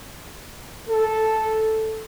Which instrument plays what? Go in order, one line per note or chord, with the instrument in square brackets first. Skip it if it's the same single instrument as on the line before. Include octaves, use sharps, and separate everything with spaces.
[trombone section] A4